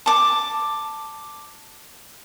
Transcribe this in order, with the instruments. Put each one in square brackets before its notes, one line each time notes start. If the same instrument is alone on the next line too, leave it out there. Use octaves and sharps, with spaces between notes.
[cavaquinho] A5 D6